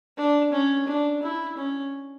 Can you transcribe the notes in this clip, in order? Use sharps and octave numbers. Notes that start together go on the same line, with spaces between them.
D4
C#4
D4
E4
C#4